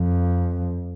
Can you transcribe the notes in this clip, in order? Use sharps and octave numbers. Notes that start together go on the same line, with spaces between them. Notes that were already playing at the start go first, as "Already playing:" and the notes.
Already playing: F2